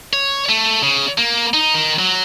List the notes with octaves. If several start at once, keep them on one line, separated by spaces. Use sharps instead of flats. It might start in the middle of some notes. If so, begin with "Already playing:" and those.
C#5
A3
C#3
A#3
D#4
D#3
F#3